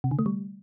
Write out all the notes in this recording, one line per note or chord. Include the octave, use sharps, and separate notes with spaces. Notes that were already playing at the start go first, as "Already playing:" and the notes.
C3
D3
A3
G3